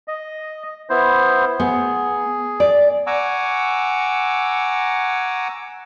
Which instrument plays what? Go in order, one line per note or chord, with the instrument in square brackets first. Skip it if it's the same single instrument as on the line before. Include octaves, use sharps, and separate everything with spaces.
[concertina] D#5
B3 E4 C5
[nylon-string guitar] B3 [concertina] G#4
[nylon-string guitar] D5
[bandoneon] F#5 G#5 A#5 C#6 D6 E6